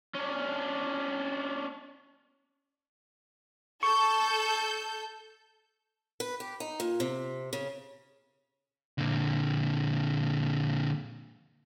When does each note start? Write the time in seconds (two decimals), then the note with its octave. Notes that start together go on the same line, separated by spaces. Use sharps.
0.15 C#4 D4
3.83 A4 C#6 G6
6.20 B4
6.40 G4
6.60 D#4
6.80 A#2
7.00 C3
7.53 C#3
8.98 A#2 D3